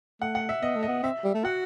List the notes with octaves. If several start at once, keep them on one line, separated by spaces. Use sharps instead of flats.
A3 F#5
F#5
E5
B3 D#5
A3
B3 D#5
C4 E5
G3
A3
F#4 F#5